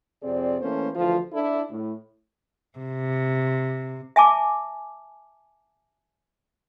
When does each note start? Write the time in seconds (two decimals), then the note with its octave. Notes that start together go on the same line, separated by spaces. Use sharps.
0.22 F2 C3 C4 G#4 D5
0.61 E3 A3 A#3 C#4 A4 C5
0.96 D2 E3 F3 F4 A4
1.33 D4 E4 A4
1.70 A2
2.78 C3
4.16 E5 G#5 A5 D6